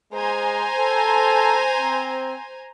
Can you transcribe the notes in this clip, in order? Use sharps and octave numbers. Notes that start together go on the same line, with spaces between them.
G#3 C5 G#5 A#5
A4
C4